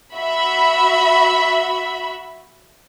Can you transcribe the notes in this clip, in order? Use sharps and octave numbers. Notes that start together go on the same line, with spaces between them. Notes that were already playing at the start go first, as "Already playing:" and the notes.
F#4 E5 B5